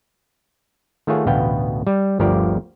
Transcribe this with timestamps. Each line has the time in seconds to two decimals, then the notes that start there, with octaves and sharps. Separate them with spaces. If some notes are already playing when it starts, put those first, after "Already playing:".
1.07 D#3 A3 F4 G#4 C#5 F#5
1.26 A1 D2 B2 B3 F5 G5
1.87 G3
2.20 G1 D2 F3 G4 A#4 D5